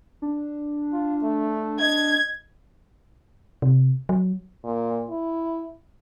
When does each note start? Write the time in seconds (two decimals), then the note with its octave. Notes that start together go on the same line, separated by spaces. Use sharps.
0.22 D4
0.92 F4
1.22 A3
1.81 D#5 G#6
3.62 C3
4.09 F#3
4.65 A#2
5.10 E4